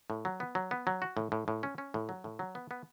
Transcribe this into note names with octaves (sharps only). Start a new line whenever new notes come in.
A2
F#3
B3
F#3
B3
F#3
F#4
A2
A2
A2
C#4
C#4
A2
F#3
A2
F#3
B3
B3